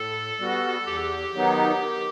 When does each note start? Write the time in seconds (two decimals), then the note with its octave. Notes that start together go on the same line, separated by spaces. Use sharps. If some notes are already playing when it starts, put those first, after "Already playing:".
Already playing: A2 A4
0.39 G3 B3 F#4
0.86 E2 G4
1.34 D#3 F#3 B3 D#4
1.81 D#3